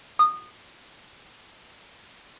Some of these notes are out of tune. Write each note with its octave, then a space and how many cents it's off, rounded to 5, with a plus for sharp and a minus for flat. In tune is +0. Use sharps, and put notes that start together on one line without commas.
D#6 -20